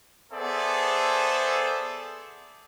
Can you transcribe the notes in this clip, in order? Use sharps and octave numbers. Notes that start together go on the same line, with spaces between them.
B3 G#4 A4 C5 D5 E5